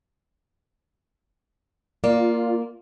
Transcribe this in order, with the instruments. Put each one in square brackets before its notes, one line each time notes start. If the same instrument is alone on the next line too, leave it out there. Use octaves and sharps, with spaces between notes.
[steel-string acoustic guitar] A#3 [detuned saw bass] F4 [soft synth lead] D5